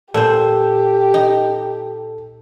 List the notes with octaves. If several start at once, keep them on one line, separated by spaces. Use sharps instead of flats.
A#2 G4 A4 C5
D#4